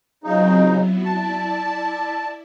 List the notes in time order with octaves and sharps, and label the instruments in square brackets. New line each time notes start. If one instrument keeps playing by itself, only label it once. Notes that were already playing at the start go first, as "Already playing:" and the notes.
[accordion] C#3 D#4 [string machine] F#3 C4 F4
[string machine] F#3 B3 E4
[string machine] E4 D5 [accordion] A5